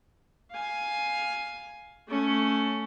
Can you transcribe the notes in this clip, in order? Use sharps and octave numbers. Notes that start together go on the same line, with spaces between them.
F5 G#5
A3 C#4